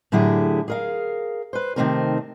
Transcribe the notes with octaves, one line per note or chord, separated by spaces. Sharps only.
A2 D3 F#3 E4 G4 G#4
G#4 A#4 F5
B4 C5
C3 D#3 A3 C4 D#4 A#4